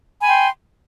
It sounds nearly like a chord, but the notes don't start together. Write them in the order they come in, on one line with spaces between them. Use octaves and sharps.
G#5 B5 G5 C6